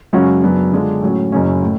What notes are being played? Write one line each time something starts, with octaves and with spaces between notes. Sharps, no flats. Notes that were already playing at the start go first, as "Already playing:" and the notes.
F#2 C#3 G#3 C#4 F#4
F#2 C#3 F#3 B3 D4
D3 G#3 D4 F4
A2 F#3 C#4
F#1 F#2 C#3 F#3 C#4
A2